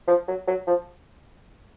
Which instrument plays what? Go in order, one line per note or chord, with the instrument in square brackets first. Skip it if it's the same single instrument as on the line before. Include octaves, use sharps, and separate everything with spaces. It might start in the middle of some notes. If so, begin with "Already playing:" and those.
[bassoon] F3
F#3
F#3
F3